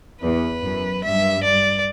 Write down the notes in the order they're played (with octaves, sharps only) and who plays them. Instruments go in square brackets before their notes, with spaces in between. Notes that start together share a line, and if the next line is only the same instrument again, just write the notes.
[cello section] E2 [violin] B4
[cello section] F#2
[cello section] G2 [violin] E5
[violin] D5